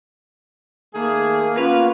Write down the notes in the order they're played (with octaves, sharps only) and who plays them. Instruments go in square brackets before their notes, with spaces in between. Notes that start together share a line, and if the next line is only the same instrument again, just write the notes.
[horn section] D#3 A3 G#4 [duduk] A#3
[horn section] B3 B4 [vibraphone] C#4 A#4 [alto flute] F4